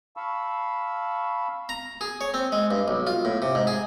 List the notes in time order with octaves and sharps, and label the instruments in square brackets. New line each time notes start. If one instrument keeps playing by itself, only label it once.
[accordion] F5 A5 B5 C#6 E6
[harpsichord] A#5
G#4
C#5
C4
G#3
G2
B1
F4
A2
C3
G#2
G#4